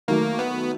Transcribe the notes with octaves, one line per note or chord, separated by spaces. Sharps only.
D#3 F#3 A3 A#3
B3